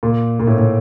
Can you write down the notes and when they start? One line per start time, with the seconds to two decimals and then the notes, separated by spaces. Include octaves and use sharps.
0.03 A#2
0.40 A#2
0.47 A2
0.58 A2